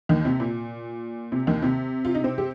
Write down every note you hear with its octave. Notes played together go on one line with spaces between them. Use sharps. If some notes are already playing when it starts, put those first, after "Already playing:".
D#2 D#3
C3
A#2
C3
D#2 D#3
C3
F4
D#4
C3 C4
G4